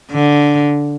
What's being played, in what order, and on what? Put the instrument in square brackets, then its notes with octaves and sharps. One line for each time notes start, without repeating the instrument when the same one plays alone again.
[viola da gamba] D3